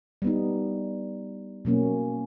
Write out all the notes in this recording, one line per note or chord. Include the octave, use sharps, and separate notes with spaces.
G3 B3 D#4
B2 F#3 A#3 C#4